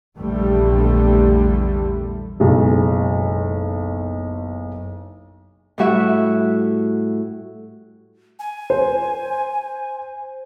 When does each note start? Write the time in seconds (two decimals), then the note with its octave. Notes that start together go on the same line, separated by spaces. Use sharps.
0.18 A#1 E2 D3 G3 A3
2.40 F#1 B1 G#3
5.78 A2 G3 E4 F#4 E5 F#5
8.39 G#5
8.70 C5